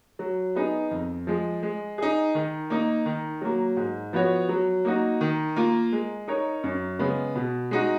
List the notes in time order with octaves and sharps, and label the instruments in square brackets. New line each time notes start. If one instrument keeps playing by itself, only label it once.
[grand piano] F#3
B3 D#4 G#4
F2
F3 G#3
G#3
D#4 G#4
D#3
A#3 D#4
D#3
F#3 A#3
G#2
F3 B3 F#4 C#5
F#3
A#3 D#4 F#4
D#3
A#3 F4
G#3
D#4 A#4 C#5
F#2
C#3 G#3 B3
B2
G#3 D#4 F#4